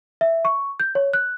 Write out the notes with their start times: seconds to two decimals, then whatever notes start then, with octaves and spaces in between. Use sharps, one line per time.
0.21 E5
0.45 C#6
0.80 G6
0.95 C#5
1.14 F#6